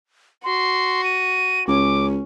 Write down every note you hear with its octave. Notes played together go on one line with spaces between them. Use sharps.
F#4 C6
D#7
C#2 C#4 D6